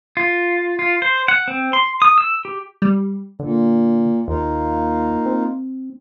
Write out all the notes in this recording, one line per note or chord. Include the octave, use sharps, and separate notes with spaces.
F4
F4
C5
F#5
C4
C6
D#6
E6
G4
G3
A#2 D3
D#2 A#3 D#4 F4
C4